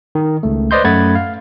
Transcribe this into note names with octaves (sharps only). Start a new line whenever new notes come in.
D#3
C#2 A3
B4 C5 D5 D#5 C6 G6
F#2 A3 F#5 B5 G#6 A6
F5